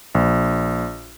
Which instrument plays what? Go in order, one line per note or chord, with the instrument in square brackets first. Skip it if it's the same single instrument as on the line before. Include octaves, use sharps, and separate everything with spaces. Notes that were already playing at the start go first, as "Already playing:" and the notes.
[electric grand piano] A#1